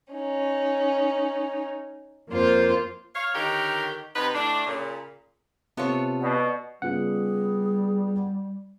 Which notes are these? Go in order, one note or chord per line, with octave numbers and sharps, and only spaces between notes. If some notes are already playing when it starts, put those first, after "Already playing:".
C#4 D#4
F2 A#3 F4 C5
C#5 F5
D3 D#3 G4 A#4 C#5
C3 D#4 B4
A2 D4
A#2 C#3
C3 B3 F4 A4 C#5
B2 D5
C#3 G3 B3 F4 G#4 F#5